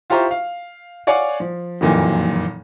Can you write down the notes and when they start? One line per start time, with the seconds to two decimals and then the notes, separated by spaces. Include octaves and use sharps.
0.10 E4 F4 G4 C5 A#5 C#6
0.31 F5
1.07 C#5 D5 F5 F#5 G#5
1.40 F3
1.81 F#1 F2 A#2 D#3 E3 F#3